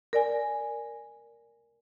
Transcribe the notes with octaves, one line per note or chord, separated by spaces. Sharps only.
A#4 D5 G#5